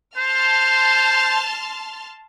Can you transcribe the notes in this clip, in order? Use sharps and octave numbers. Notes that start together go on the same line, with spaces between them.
C5 A5 C6 F6